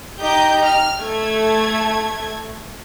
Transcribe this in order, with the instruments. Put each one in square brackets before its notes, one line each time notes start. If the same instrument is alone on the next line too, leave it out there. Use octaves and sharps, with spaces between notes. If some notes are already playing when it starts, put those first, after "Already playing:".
[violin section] D#4 G4 D#5 A#5 G6
F6
A3 G#6